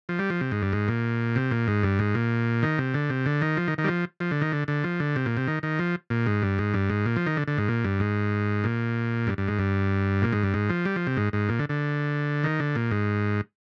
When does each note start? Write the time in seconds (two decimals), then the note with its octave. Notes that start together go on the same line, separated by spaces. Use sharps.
0.09 F3
0.19 G3
0.30 F3
0.41 C3
0.51 G#2
0.62 G2
0.73 G#2
0.88 A#2
1.36 C3
1.51 A#2
1.68 G#2
1.83 G2
1.99 G#2
2.15 A#2
2.63 D#3
2.78 C3
2.94 D3
3.10 C3
3.26 D3
3.41 D#3
3.57 F3
3.68 D#3
3.78 D#3
3.84 G3
3.88 F3
4.20 F3
4.31 D3
4.41 D#3
4.52 D3
4.68 D3
4.84 F3
5.00 D3
5.16 C3
5.26 A#2
5.37 C3
5.48 D#3
5.63 D#3
5.79 F3
6.10 A#2
6.26 G#2
6.42 G2
6.59 G#2
6.74 G2
6.90 G#2
7.06 A#2
7.16 F3
7.26 D#3
7.37 D3
7.48 D3
7.58 G#2
7.69 A#2
7.84 G2
8.00 G#2
8.64 A#2
9.27 G2
9.38 G2
9.48 G#2
9.59 G2
10.22 A#2
10.33 G#2
10.43 G2
10.54 G#2
10.69 F3
10.85 G3
10.96 F3
11.07 C3
11.17 G#2
11.33 G#2
11.49 A#2
11.59 D3
11.69 D3
12.44 D#3
12.60 D3
12.75 A#2
12.91 G#2